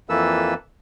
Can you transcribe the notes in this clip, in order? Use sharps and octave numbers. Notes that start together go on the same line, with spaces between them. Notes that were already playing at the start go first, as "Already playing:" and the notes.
F2 E3 A#3 A4 B4 E6